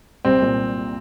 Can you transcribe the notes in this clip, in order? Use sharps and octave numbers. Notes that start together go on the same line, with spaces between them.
C2 C4
A#2